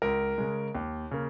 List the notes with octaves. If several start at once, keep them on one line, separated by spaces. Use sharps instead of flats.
C#2 A#4
C#3 G#3
D#2
C#3 A#3